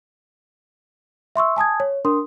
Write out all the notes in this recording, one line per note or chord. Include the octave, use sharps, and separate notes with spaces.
E5 C6 C#6 E6
G#5 A5 D#6 G#6
C#5
D4 A#4 C6 D#6